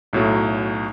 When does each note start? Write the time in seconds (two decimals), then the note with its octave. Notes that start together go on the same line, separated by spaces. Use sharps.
0.13 B1 A2 F#3 A3